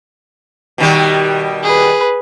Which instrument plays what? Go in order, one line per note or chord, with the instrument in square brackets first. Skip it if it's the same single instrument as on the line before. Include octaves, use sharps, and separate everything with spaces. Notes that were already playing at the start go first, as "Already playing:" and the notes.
[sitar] B2 D#3 G3
[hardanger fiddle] G#4 B4